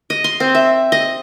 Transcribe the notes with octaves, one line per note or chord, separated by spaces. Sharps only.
D#5
C6
C4
E5
D#5